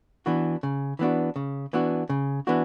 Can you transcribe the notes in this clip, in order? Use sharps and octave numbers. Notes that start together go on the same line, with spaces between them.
E3 B3 D4 F#4
C#3
E3 B3 D4 F#4
C#3
E3 B3 D4 F#4
C#3
E3 B3 D4 F#4